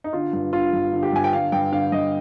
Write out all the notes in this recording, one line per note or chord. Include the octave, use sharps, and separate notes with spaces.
D#4
D3 F4
G2
D3 F4
G2
D3
G4
G2 G#5
G5
D3 F5
G2 G5
D3 F5
G2 D#5